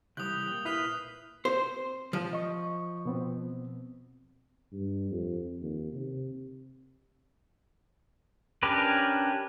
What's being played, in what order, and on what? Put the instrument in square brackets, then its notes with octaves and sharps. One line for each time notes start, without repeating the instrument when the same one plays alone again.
[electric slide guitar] C3 E3 G3 [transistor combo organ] G4 [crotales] D#6 F#7 [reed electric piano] F#6
[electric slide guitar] A#2 [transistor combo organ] G5
[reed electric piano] E4 D#6 F#6 [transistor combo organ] B4 [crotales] F6 C7 F7
[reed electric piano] C4 [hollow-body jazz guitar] C5
[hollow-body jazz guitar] F3
[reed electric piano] D#5 C#6
B2 B3 C4
[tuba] G2
F2
D#2
C3
[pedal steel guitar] C#4 D4 G4 A#4 B4